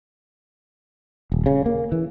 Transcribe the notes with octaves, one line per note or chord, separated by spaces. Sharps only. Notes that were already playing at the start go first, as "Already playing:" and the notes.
D#1
C#3
A#3
E3